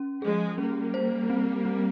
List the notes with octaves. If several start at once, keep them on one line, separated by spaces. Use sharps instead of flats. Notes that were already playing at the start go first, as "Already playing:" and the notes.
Already playing: C#4
F3 G#3 G#4
G3 A#3 C#4
C5
C4
C4